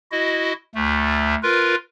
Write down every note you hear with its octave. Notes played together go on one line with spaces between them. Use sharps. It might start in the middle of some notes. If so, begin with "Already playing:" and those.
E4 F#4 D#5
D2 A3
F4 A#4 B4